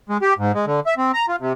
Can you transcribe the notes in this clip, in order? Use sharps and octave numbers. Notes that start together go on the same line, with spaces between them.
G#3
G4
G#2
G#3
D3
E5
C4
A#5
F4
C3